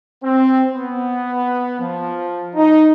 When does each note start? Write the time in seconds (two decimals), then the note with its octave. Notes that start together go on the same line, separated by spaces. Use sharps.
0.24 C4
0.73 B3
1.80 F3
2.56 D#4